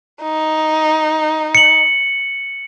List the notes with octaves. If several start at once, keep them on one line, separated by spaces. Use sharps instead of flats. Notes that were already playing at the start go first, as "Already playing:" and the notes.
D#4
C#7 F#7